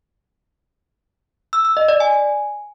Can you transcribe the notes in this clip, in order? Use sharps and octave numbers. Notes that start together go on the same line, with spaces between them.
E6
E6
D#5
D5
G#5